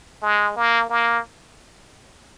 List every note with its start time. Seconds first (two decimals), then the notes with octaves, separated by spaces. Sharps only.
0.22 G#3
0.56 A#3
0.90 A#3